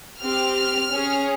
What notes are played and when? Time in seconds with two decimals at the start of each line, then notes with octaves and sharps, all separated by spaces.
0.21 C4 G4 F6
0.91 C#4 G#4